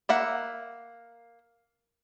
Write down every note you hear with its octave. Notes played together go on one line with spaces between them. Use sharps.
A#3 E5 F#5